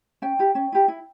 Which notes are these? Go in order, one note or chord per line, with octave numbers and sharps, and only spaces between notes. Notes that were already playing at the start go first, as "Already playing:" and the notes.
C#4 G5
E4 G4
C#4
E4 G4
E4